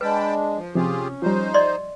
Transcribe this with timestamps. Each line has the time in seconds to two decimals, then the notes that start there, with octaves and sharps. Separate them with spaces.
0.01 G#3 D4 B4 G5 A5 B5
0.55 F3
0.75 C3 F3 C#4 F4 G4 G#4
1.22 F3 G3 D#4 C5
1.54 D5 D#5 C6